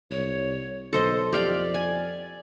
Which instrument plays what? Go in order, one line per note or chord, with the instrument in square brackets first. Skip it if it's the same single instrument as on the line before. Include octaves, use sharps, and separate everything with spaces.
[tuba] C2 [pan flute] C#5
[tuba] B1 [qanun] A4 C5 D#5 [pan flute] C6
[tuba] F2 [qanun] G4 F5 G5 [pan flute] D5
[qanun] G#5